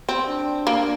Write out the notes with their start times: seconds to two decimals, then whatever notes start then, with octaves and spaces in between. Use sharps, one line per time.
0.09 C4
0.28 D4
0.67 A#3